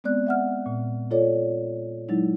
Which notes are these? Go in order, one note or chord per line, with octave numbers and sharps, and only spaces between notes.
G#3 B3 C4 D5 F#6
E5 F#5 F6
A#2
F4 A4 C#5 D5
F#3 G#3 D#4 E4